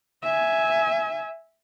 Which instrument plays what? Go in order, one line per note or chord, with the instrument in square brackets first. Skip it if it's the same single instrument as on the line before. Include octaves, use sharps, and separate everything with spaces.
[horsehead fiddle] E5 G#5